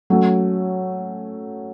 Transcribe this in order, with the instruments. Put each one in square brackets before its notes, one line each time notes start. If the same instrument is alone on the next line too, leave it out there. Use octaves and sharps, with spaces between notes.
[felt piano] F#3 A3 C#4